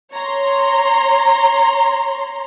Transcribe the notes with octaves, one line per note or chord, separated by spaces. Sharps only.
C#5 A#5 C6